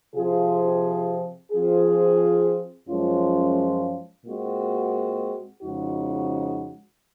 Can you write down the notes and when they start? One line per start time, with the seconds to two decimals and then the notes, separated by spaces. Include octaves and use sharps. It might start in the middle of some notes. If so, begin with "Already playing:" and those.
0.15 C3 F3 C4 F4 G#4
1.52 F3 C4 F4 G#4
2.89 F#2 F3 G#3 C#4 F4
4.25 A#2 G#3 C4 F#4
5.62 F2 C#3 G#3 D#4 F#4